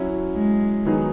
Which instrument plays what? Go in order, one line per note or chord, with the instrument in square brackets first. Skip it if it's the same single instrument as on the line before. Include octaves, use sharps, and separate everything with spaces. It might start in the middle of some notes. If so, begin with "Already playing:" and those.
Already playing: [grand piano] F#3 C#4 E4
[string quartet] G#3
[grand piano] D#3 F#3 B3 D#4 G#4